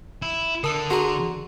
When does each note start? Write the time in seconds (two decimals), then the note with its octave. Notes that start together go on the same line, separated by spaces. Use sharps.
0.22 E4
0.64 D3 A#4 A5 E6
0.90 F#4 G#4 A#5 C6